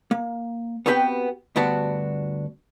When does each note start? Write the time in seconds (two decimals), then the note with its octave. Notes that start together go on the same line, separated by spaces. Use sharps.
0.11 A#3
0.86 B3 C4 F#4 G4 B4 G5
1.56 D2 G2 B3 D4 F#4 A5